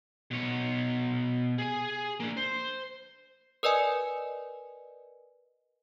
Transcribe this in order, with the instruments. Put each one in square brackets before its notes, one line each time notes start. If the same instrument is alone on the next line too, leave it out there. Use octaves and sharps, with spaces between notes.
[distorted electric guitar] B2 C#5
G#4 G#5
A#3 D4
C5
[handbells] A#4 B4 D5 D#5 G#5